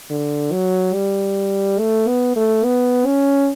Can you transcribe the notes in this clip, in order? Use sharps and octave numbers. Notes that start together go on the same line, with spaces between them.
D3
F#3
G3
A3
B3
A3
B3
C#4